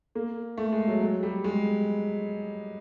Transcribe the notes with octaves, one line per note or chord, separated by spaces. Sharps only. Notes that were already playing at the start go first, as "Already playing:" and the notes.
A#3
A3
G#3
F#3
F#3
G3
G#3